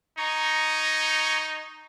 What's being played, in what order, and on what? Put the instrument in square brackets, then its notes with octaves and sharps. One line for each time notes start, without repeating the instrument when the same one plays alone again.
[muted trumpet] D#4 [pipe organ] A#5 C#6 G#6